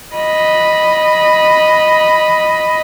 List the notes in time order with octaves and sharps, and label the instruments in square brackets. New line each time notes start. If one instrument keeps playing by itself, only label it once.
[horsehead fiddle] D#5 B5